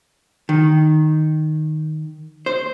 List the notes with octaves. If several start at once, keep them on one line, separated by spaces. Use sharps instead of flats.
D#3
C5